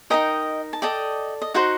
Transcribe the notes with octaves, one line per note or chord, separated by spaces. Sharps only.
D#4 G4 A#4 D#5 G5
A5
A4 D5 D#5 G5
D#5
D#4 F#4 C5 F#5